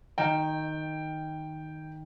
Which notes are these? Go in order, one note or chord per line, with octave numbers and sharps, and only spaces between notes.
D#3 G5